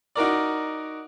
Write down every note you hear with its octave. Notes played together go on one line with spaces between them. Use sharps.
D#4 F#4 A#4 D5